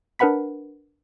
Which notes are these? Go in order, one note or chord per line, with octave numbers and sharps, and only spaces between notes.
D4 A#4 B4 F#5 B5 B6